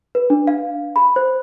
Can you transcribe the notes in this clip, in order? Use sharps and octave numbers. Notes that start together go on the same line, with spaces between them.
B4
D4
F5
B5
C5